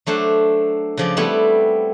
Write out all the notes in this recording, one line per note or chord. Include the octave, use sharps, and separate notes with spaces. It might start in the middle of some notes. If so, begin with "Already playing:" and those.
F#3 A3 D4 C5
C#3 F3 D5
G3 A3 B3 C4 E4